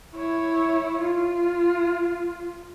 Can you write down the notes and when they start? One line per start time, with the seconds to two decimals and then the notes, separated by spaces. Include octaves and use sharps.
0.15 E4 C#5
1.02 F4